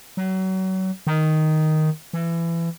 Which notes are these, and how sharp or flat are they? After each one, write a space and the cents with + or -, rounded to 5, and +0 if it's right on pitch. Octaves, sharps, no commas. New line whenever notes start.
F#3 +30
D#3 +0
E3 +25